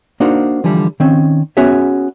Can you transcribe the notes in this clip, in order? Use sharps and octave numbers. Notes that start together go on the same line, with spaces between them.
A#3 D4 D#4 F#4 A#4 C5
D3 E3 F3 G3
D#3 C4 C#4
B3 C#4 F#4 G#4 C#5 E5